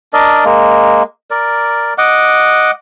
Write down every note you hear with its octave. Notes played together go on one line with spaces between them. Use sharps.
D4 A#4 D5 D#5
G#3 A#3
A#4 D5
D#5 F#5 D6